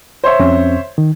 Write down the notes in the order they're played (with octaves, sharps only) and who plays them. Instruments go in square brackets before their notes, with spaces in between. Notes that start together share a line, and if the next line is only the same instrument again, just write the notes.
[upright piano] C5 C#5 E5
[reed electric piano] F2 C4 C#4
D#3